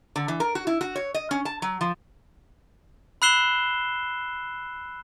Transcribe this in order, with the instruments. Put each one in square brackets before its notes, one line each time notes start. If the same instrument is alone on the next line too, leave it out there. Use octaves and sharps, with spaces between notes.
[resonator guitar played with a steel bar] D3
E3
A#4
F#4
E4
F#4
C#5
D#5
C#4
A5
F#3
F3
[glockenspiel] B5 E6 F#6 C7 E7 G7